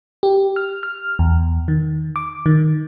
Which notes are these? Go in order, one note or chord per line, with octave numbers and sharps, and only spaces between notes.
G4
F6
F6
E2
D#3
D6
D#3